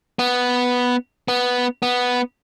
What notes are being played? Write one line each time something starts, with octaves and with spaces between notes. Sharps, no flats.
B3
B3
B3